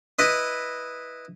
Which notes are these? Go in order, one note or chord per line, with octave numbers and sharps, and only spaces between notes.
E4 B4 D#5